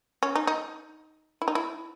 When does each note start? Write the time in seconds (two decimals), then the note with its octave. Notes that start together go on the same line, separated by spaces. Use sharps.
0.23 C#4
0.35 D#4
0.47 D#4
1.42 E4
1.48 D#4
1.55 E4